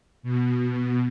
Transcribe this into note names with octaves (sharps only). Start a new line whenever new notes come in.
B2